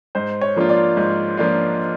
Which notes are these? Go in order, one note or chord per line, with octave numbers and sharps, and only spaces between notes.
G#2 C5
C#5
F3 A#3 D4 F4
D5
G#2
F3 A#3 D4 F4